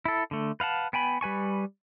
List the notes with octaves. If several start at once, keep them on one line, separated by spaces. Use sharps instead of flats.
E4 A4
D3 A3
B4 F5 F#5 A5
B3 G5 G#5 B5
G3 B4 G#5 C#6